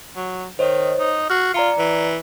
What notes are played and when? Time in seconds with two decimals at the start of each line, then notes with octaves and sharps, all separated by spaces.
0.16 F#3
0.59 D#3 C5 C#5 D#5
0.99 D#4
1.30 F#4 F6 C7
1.54 F4 D5 A#5 C#7
1.78 E3